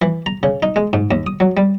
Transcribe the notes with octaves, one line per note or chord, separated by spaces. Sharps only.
E3
A#5
C#3
D#4
G#3
G#2
D#2
D#6
F#3
G3